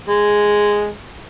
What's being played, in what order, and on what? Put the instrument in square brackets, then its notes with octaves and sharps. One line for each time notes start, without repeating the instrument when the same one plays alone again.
[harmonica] G#3